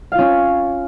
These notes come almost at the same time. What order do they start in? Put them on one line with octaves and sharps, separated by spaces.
F5 F4 C#4